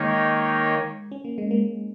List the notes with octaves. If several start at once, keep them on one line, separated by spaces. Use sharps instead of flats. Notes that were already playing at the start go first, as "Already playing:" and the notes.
Already playing: D#3 G#3 A#3 D#4 C#5
C#4
A#3
G#3
A#3